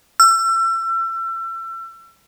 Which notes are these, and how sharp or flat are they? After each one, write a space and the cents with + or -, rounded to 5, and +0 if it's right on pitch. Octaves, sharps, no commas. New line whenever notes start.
E6 +35